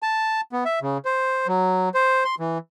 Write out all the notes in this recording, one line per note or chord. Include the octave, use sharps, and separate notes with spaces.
A5
B3
E5
C#3
C5
F#3
C5
C6
E3